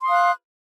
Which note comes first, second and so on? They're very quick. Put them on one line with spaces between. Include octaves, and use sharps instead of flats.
C6 D#6 F5 F#6